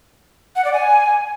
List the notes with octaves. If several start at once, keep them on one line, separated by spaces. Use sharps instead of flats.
F#5
D5
G#5